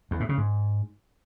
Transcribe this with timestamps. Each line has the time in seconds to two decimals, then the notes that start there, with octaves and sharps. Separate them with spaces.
0.11 E2
0.20 A2
0.29 C#3
0.38 G#2